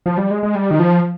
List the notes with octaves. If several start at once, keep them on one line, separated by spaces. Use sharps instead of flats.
F3
G3
G#3
G#3
G3
D#3
F3